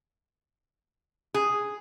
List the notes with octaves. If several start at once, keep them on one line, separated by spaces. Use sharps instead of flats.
G#4